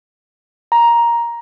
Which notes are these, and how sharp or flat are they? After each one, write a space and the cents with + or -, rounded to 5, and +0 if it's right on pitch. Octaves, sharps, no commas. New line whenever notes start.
A#5 +10